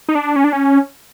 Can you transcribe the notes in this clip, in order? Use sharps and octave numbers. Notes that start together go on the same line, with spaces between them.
D#4
D4
C#4
D4
C#4